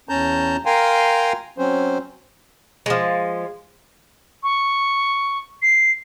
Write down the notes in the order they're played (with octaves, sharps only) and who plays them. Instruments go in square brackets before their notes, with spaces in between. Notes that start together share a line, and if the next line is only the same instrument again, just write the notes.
[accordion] E2 C#4 A5 A#5 G6
A#4 F5 G5 G#5 A#5 C6
F#3 C4 C#4 C5
[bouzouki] F3 G#3
[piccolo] C#6
C7